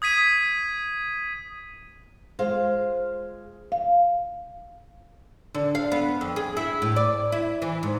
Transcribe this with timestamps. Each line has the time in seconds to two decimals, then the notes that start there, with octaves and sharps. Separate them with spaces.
0.02 D#6 G#6 B6 D#7
2.39 G#3 F4 C5 F5
3.72 F5
5.54 D3
5.75 F5
5.92 B3
6.21 F2
6.36 G#4
6.57 E4
6.82 A2
6.96 D5
7.32 E4
7.62 E3
7.83 G#2